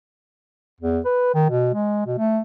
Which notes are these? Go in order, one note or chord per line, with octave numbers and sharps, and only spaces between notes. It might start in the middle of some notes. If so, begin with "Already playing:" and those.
E2
B4
D#3
B2
G#3
B2
A3